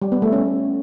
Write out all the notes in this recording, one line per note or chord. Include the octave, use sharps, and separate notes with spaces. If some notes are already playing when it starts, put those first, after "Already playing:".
G3
B3
A3
C#4